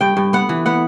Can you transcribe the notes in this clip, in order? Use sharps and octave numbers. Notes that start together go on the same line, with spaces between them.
G2 G5
G2
B3 F#5
E3
B3 F#5